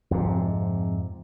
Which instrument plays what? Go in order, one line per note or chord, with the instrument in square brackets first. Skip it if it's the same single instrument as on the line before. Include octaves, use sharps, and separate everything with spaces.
[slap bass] F2 G#2 C3